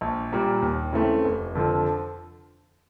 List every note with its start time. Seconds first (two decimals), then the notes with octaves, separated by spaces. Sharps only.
0.01 A#1
0.32 A#2 G3 A#3
0.62 D#2
0.93 C#3 E3 A3 C4
1.24 F1
1.55 F2 D3 F3